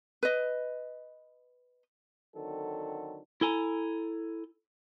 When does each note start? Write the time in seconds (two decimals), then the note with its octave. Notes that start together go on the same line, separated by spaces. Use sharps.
0.23 B4 D#5
2.36 D3 D#3 F#3 C4 A4
3.41 E4 A4 G#5 A#5